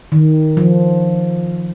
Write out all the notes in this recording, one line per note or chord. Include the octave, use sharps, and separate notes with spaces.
D#3
F3